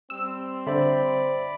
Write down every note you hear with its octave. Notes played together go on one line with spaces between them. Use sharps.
G3 C4 E6
D3 C5 D5 E5 B5